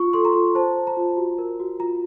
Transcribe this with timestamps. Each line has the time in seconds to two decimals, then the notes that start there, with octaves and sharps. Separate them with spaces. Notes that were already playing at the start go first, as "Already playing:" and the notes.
Already playing: F4 C#6
0.13 A4 C6
0.25 A#5
0.35 F4
0.55 C5 A5
0.77 C5
0.87 A#5
0.97 F4
1.17 F#4
1.38 A#4
1.60 F#4
1.79 F4 A#5